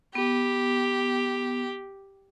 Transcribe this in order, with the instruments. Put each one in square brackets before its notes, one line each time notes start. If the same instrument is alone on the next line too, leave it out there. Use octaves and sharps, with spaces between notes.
[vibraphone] B3 [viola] G4